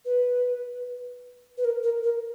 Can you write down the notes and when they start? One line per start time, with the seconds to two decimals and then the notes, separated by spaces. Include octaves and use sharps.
0.05 B4
1.58 B4
1.65 A#4
1.83 A#4
2.03 A#4